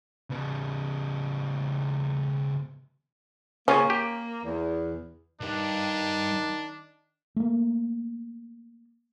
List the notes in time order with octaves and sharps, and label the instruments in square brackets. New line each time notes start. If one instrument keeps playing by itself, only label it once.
[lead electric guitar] C#3 B3
[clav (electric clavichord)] C#3 F4 G#5 [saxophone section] A#3 [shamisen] C#4
[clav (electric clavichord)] G4
[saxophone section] E2
[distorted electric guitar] C2 G2 [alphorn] D#3 [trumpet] D4
[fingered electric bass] A3 A#3